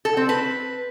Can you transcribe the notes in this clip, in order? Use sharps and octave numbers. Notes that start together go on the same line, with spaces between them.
A4
C4
B4